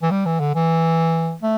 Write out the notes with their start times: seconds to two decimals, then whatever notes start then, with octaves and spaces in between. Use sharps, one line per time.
0.02 E3
0.11 G3
0.26 E3
0.40 D3
0.55 E3
1.43 A3